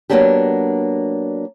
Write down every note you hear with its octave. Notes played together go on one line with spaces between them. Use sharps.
F#3 G#3 A#3 B3 D4 G4